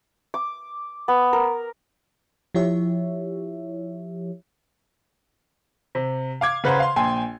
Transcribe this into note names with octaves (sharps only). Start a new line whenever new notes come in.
D6
B3
A#4
F3 E4 G4 C#5 E5
C3
F5 D6 G#6
C#3 B4 C5 F#5 A#5 C6
F5 C6
A#1 G5 G#5 C6